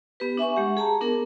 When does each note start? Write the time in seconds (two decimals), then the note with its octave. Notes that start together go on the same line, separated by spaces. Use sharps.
0.20 B3 G4 B4
0.37 D4 E5 G#5 C#6
0.56 G#3 G4 F#5
0.77 G#4 A5 A#5
1.01 B3 D4 G#4 A#4